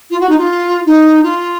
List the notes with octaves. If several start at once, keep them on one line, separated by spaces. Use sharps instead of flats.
F4
F#4
D#4
F4
D#4
F4